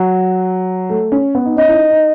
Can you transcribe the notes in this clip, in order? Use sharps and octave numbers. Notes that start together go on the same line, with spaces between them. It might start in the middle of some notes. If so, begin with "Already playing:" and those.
Already playing: F#3
A3
C#4
B3
D#4
C#4 D#5
E4
D#4
D#4